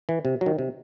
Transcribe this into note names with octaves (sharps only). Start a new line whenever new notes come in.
E3
C3
F#3
D#3
C3